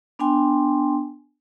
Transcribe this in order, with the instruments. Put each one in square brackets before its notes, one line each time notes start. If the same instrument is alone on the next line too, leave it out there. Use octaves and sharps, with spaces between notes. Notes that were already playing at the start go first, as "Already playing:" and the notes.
[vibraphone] B3 D4 G5 G#5 C6